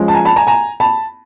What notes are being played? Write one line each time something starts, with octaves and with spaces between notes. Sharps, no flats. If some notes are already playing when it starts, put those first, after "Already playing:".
Already playing: F3 G#3 C#4
A5
G#5 A#5
A5 B5
G#5 A#5
G#5 A#5
A5 B5